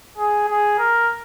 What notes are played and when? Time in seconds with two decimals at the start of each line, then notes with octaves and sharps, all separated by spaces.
0.18 G#4
0.48 G#4
0.79 A#4